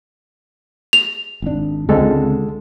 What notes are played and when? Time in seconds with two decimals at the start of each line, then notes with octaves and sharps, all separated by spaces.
0.93 F7
1.42 G#1 D4
1.89 C#2 D3 G#3 C4 A4